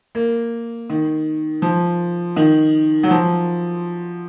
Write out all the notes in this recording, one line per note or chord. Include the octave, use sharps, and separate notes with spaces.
A#3
D#3
F3
D#3
F#3
F3